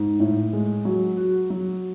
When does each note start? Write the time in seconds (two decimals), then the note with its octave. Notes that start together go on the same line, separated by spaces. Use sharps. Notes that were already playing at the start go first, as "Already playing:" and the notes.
Already playing: G#2
0.20 A2
0.53 G#3
0.85 F#3
1.17 F#4
1.50 F#3